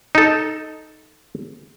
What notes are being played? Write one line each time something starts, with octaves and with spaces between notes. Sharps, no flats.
D#4 A4